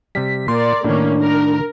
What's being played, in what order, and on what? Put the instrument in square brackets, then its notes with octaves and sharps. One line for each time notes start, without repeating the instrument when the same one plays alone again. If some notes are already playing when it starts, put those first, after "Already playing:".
[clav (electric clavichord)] C3 G3 [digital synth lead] B6
[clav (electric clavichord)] A#2 A#3 [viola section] A#4 D5 [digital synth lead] C6
[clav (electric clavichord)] A2 D#3 [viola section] A#3 C#4 [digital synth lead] D4
[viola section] A#4